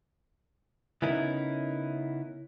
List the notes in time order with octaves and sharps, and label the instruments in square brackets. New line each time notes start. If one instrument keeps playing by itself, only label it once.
[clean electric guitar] C#3 B3 C#4 D#4 E4 A#4